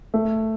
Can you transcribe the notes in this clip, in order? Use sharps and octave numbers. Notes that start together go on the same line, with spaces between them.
A3